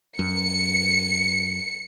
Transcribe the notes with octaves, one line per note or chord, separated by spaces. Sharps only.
F#2 C#7